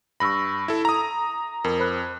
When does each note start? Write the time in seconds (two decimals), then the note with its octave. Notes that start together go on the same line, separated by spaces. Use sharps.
0.20 G2 B5 C#6 E6 A#6
0.68 E4 A4
0.85 A#5 D#6
1.64 F2 A#4
1.80 C5 B5 F#6